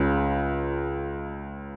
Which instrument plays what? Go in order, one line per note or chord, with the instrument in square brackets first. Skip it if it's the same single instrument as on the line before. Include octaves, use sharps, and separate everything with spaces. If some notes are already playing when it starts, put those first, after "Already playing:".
Already playing: [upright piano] C#2 C#3